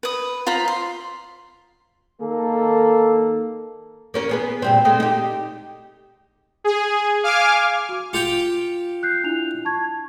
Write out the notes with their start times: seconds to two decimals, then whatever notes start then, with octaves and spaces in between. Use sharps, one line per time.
0.03 B4 D#6
0.47 F4 C5 A#5 B5
0.68 C6
2.20 D#3 A#3 A4
4.14 A#3 C#4 A#4
4.29 B3 G#4 B4
4.62 A#2 G3 C4
4.85 G#3 A3 C4
5.00 D#4 G4
6.64 G#4
7.23 F5 G#5 D6 F6
7.89 F#4 D6
8.13 F4 G4 G5 C#7 F7
9.03 F#6 G6 C7
9.24 D4 E4 F7
9.65 A5 C#6 G#6